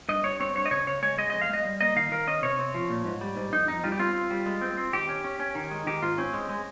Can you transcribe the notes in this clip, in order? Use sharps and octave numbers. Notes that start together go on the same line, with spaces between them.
G2 D#5
G2 C#5
C4 C#5
G2 C#5
D#5
C#3 C#5
C#3 C#5
G#3 C#5
G#3 D#5
F2 D#5
F5
G#3 D#5
G3
A#3 D#5
D#3 F5
D#3 A#4
C#4 D#5
C3 C#5
C4
F3
A#2
G#2
G3
G#2
F2 D#4
F2 D#4
G3 F4
G4
C4 F4
C4
G3
G#3
C4
C4
D#3 G4
C#4
C#4
C#4
D#3
G#3
D#3 G4
G#2 F4
C4 C#4
G#3
G#3